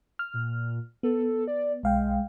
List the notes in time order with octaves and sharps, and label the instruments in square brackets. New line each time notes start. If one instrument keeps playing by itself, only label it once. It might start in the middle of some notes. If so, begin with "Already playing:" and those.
[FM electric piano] F6
[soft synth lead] A#2
[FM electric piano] B3 [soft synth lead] A4
[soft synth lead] D5
[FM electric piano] B1 F5 G5 [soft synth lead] G#3